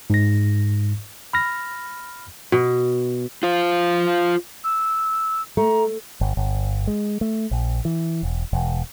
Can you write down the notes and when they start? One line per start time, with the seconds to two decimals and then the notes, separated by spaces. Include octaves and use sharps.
0.10 G#2 A#6
1.33 B5 F6 A#6
2.52 B2
3.43 F4 C5
4.64 E6
5.57 A3 A#5
6.21 G1
6.37 G1
6.87 G#3
7.21 A3
7.51 A#1
7.85 E3
8.23 E1
8.53 E1